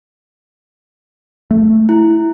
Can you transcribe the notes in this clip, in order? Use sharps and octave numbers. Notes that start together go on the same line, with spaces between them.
A3
E4